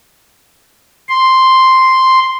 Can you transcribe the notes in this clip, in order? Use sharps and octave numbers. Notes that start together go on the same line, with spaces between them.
C6